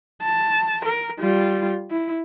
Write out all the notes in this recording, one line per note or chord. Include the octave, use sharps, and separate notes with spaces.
A5
A#4
G3 F4
E4